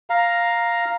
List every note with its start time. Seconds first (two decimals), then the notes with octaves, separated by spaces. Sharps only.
0.10 F5 A#5